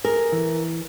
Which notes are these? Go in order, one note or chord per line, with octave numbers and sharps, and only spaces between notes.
G#4 A#4
E3